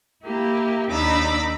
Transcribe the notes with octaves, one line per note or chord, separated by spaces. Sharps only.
A#3 E4 G4
D#2 D4 D#4 B5 D6 E6